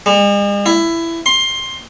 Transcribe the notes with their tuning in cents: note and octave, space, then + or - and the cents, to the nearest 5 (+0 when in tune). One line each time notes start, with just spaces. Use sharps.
G#3 -45
E4 +15
C6 +15